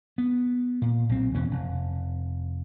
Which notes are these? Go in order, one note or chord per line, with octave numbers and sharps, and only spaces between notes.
B3
A#2
B1 C4
E2 B2 E3 C#4
F1